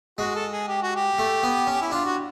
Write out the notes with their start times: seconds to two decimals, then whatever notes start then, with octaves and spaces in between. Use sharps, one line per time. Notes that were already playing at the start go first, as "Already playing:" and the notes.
0.18 G#3 F#4
0.35 A4
0.52 G#4
0.68 G4
0.83 F#4
0.96 G4
1.18 A3
1.43 B3
1.67 C#4
1.82 E4
1.92 D4 F4
2.05 F#4